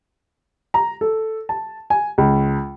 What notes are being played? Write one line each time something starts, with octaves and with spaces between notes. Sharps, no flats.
A#5
A4
A5
G#5
C#2